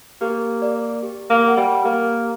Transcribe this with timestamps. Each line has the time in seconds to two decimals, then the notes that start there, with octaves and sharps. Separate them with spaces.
0.21 A#3 G4
0.62 A#4 D5
1.03 G4
1.30 A#3
1.44 A#4 F#5
1.57 G3
1.84 A#3 G4